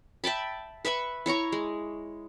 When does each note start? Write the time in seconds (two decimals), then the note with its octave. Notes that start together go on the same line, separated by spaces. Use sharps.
0.24 E5 G5 A5 B5
0.85 B4 E5 B5 C#6
1.26 E4 C#5 A#5 C#6
1.52 G#3